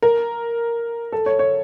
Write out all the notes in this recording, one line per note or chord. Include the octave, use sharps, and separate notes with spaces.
A#4
A4
C#5
C#5